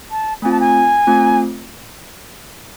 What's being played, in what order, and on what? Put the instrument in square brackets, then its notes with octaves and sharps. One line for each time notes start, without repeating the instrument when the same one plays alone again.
[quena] A5
[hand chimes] A3 C4 F4 [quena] G#5
[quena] A5
G#5
[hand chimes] A3 C4 F4